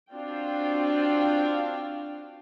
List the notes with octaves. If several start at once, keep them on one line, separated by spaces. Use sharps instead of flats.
C4 D4 F4 F#4 F5 G5